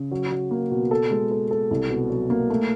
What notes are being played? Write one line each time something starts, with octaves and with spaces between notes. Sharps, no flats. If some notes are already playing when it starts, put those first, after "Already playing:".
Already playing: C#3
F#3
F#3
A#3
B2
A4
G#3
A4
A4
C2
B2
F#3
A#3
A3